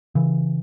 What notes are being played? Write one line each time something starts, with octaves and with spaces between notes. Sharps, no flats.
C#3 E3